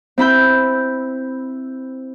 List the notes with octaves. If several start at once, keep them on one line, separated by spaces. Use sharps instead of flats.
C4 E4 B5 G6